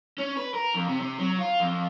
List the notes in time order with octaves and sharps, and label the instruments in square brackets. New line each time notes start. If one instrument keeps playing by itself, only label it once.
[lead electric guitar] C#4
B4
A#4
F2
C3
C3
F#3
F4
F2